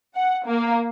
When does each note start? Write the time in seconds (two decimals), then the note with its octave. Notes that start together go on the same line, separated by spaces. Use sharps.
0.16 F#5
0.47 A#3